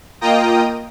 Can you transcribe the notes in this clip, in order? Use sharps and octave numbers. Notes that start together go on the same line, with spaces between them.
A#3 F4 D#5 G5 A#5 D#6